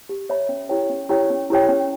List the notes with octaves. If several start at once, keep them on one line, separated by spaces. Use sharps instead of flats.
G4
C#5 E5 B5
C#4
E4 G4 C#5 G5
C#4
E4 G4 C#5 G5
C#4
E4 G4 C#5 G5
C#4